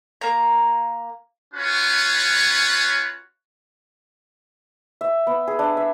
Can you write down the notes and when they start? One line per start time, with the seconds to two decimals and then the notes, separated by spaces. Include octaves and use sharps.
0.21 A#3 A#5
1.54 C#4 F4 F#4 B4 C#5
5.01 E5
5.27 B3
5.47 G#4
5.59 D4
5.77 E5